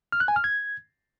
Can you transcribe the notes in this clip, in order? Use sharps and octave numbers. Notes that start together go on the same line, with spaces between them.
F6
F#6
G#5
F6
G#6